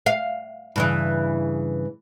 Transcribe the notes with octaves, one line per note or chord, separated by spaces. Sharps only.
F5
G2 C#3 E3